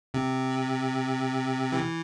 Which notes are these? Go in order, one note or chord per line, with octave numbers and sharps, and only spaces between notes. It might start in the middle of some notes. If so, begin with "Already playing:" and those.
C3
E3